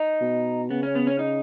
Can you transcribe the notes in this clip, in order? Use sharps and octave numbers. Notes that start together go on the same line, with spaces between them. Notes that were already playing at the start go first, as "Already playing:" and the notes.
Already playing: D#4
B2
C#3 B3
C#4
B3
C#4
D#4